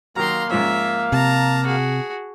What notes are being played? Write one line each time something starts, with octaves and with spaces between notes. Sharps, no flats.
D#3 F#3 A#3 F5 A#5 C6
G#2 F3 C#4 E5
C3 A5 A#5
F#4 G#4